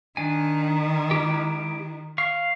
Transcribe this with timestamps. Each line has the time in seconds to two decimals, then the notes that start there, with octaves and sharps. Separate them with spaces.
0.17 D#3 D4 G#5
1.11 G#3 E4 G4
2.18 F5 C#6